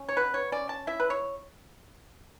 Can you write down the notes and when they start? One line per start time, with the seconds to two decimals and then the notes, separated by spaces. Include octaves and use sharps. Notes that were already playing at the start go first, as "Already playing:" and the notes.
Already playing: C#4
0.09 C#5
0.17 B2 B4
0.34 C#5
0.52 C#4 D5
0.69 A5
0.87 E4 E5
1.00 B4
1.10 C#5